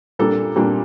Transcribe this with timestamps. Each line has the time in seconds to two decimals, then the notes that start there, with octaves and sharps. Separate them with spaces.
0.19 A#2 G3 A#3 D4 A4
0.56 A#2 G3 A#3 D4